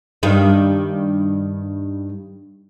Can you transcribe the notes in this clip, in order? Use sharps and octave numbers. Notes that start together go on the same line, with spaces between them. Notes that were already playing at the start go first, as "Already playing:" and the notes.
G2 D#3